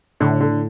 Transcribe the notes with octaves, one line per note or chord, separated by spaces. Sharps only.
A2 D3
D3